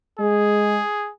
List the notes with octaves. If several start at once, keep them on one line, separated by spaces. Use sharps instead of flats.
G#3 G#4